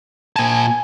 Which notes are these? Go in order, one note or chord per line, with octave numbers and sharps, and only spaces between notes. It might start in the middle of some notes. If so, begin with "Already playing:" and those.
A#2 G#5 A5